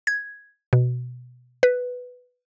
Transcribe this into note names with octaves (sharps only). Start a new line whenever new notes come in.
G#6
B2
B4